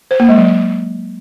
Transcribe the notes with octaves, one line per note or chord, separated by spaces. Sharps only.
C5
A#3
G#3
F#3